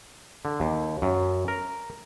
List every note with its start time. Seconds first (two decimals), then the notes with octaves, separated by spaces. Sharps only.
0.45 D3
0.60 D#2
1.02 F#2
1.48 A#4